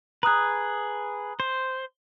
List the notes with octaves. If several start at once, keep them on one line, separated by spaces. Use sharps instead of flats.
G#4 B4 A#5 D#6 F#6
C5